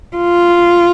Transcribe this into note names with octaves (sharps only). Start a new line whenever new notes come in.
F4